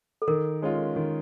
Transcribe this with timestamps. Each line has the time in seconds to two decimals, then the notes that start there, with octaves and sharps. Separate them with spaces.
0.22 A4
0.27 D#3 A#4
0.62 G#3 C#4 F4
0.96 D#3